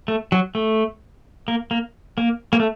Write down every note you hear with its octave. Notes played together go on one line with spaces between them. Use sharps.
A3
F#3
A3
A#3
A#3
A#3
A#3
A3